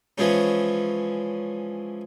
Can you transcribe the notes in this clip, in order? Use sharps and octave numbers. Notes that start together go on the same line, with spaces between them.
E3 F3 G#3 C#4